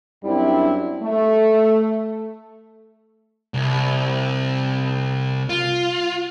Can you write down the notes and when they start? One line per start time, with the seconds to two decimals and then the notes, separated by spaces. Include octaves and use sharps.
0.23 F#2 G3 C4 D4 E4
1.02 A3
3.54 C2
5.49 F4